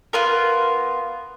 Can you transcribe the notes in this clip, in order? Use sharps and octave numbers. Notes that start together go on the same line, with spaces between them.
B3 F4 A#4